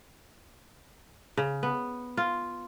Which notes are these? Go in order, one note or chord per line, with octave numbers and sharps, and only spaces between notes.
C#3
B3
F4